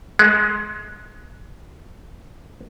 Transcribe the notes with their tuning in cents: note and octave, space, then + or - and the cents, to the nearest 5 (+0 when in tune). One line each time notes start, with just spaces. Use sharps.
G#3 +15